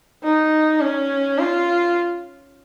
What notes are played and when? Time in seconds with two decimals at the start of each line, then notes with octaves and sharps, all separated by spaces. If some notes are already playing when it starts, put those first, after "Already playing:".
0.23 D#4
0.80 C#4
1.38 F4